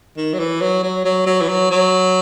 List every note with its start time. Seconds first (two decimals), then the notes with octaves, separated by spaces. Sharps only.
0.17 D#3
0.34 F#3
0.39 E3
0.62 F#3
0.83 F#3
1.05 F#3
1.26 F#3
1.42 E3
1.49 F#3
1.71 F#3